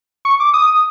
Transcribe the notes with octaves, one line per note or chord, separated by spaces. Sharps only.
C#6
D6
D#6